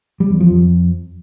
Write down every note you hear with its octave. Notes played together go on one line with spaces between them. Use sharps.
G3
E2
F3
F2